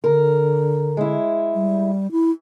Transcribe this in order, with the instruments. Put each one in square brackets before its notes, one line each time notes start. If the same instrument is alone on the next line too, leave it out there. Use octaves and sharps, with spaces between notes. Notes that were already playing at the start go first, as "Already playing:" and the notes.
[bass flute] D3 [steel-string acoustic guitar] A#4
[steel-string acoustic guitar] G#3 E4
[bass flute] G3
E4